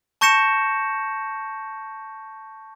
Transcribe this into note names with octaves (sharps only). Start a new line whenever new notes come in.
A5 C#6 G6 A#6 C#7 E7